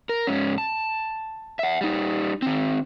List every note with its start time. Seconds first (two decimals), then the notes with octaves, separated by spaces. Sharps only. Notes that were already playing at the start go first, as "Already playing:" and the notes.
0.09 A#4
0.27 G#2 C#4
0.58 A5
1.59 E5 F#5
1.81 G3 D#4
2.42 D#3 C4